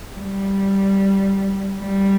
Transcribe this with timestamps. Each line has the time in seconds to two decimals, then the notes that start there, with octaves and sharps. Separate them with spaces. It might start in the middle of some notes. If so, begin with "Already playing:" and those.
0.14 G3
1.80 G3